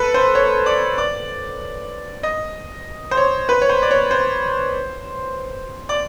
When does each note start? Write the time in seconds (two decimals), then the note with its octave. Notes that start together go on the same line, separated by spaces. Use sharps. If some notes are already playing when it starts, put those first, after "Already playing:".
Already playing: A4 B4
0.14 C5
0.35 C#5
0.66 D5
0.98 D5
2.23 D#5
3.11 C5
3.17 C#5
3.49 B4
3.62 C#5
3.69 C5
3.82 D5
3.91 C#5
4.11 C5
5.89 D5